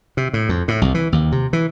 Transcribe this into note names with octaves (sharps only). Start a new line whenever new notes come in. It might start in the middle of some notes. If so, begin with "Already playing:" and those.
C3
A2
F2
A2
C2
E3
D#2
C3
E3